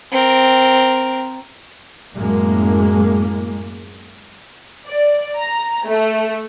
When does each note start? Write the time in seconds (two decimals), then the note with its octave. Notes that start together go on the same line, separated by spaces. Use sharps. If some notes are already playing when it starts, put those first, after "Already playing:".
0.12 C4 A#4
2.14 F#2 A2 G#3 A#3
4.87 D5
5.36 A#5
5.86 A3